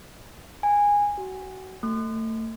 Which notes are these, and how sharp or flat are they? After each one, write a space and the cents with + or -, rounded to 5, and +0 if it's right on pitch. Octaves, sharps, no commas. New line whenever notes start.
G#5 -15
F#4 +30
A3 +30